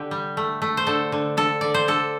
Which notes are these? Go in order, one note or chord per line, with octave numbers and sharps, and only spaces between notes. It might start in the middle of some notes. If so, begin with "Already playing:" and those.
Already playing: D3 G4
G3
A3
A3
C5
D3 A4
D3
D3 A4
D3 D5
C5
D3 A4